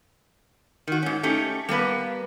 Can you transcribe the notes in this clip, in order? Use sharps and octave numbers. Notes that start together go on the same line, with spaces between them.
D#3 F#4
G#2 C#4
A3 C#4 D#4 G4
G3 A#3 B3 B4